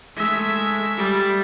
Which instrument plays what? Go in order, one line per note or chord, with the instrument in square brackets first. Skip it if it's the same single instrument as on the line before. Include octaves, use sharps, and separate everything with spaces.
[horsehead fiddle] G#3 A3 [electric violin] E5
[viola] G3